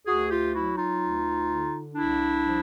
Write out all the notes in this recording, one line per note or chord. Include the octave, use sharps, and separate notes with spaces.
D2 F#4 G#4
F4 G4
F#3 E4 F#4
D#4 F4
D2
D3
C2 D4 E4
F3